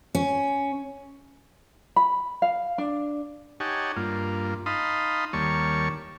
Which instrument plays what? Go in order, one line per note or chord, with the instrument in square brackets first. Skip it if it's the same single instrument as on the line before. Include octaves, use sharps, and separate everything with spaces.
[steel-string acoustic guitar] C#4
[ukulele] B5
F5
D4
[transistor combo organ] D#4 G4 C#5 F#5 G#5 A5
G2 A#3 F4
D#4 F5 A5 B5 C6 D#6
D#2 G3 A#3 C#5 A5 C#6